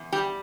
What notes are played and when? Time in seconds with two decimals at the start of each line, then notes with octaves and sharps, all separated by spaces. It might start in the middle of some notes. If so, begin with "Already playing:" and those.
Already playing: E2
0.12 G3 G4